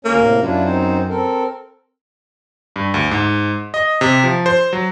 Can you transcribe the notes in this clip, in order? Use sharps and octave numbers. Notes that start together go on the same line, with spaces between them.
D2 A#3 C#4 C#5
A2 C3
F#2 D4 E4 F4
C4 D#4 C5
C4 A4 A#4
G2
D2
G#2
D#5
C3
F3
C5
F#3